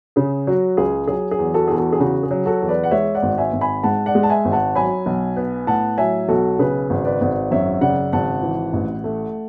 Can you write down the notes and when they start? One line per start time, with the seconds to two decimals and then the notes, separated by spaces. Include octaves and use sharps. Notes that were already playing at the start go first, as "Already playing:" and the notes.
0.16 C#3 G#4
0.47 F#3 F#4
0.77 C#2 G#4
1.08 F#3 G#4
1.31 G#4
1.39 E2
1.54 F#4 A4
1.68 E2 G#4
1.77 F#4 A4
1.93 G#4
2.00 C#3 F#4
2.23 G#4
2.31 F#3
2.46 F#4 A4
2.62 E2
2.68 B4 D5
2.84 F#5
2.91 G#3 C#5 E5
3.15 D5 F#5
3.23 G#1
3.38 E5 G#5
3.53 G#1
3.61 G#5 B5
3.83 G#2 F#5 A5
4.06 D5 F#5
4.15 G#3
4.23 A5
4.30 E5 G#5
4.45 G#1
4.52 F#5 A5
4.75 F#3 G#5 B5
5.06 B1
5.37 B3
5.67 A2 F#5 A5
5.98 F#3 E5 G#5
6.29 B1 F#4 A4
6.59 C#3 G#4 B4
6.90 G#1
7.05 B4 D5
7.21 G#1
7.51 F#2 C#5 E5
7.81 C#3 D5 F#5
8.13 G#1 F#5 A5
8.43 E3
8.73 A1
9.04 A3